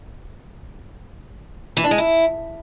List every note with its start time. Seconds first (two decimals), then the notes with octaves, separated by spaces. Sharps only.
1.77 E3
1.84 D4
1.91 G#3
1.98 E4